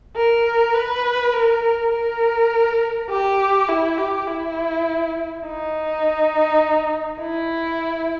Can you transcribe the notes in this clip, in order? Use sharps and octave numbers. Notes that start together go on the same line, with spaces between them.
A#4
B4
A#4
A#4
G4
E4
G4
E4
D#4
E4